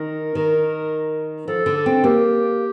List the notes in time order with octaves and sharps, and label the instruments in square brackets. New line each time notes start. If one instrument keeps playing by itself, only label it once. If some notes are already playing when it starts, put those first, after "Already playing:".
Already playing: [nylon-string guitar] D#3 [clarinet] A#4
[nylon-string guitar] D#3
[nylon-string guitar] F3 [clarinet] A4
[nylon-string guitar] D3
[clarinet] A4
[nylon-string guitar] C4
[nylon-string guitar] A#3 [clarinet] G4